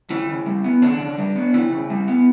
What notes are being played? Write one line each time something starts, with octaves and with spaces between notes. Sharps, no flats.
C#3 E4
C#3
G3
B3
C#3 D4
C#3
G3
B3
C#3 E4
C#3
G3
B3